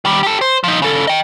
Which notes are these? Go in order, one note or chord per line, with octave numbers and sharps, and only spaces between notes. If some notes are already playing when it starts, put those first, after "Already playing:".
D#3 G3
G4 A4
C5
F3 D#4
C#3 A4
D#5 G5